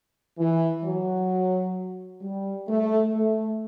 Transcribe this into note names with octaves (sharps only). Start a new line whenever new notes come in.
E3
F#3
G3
A3
A3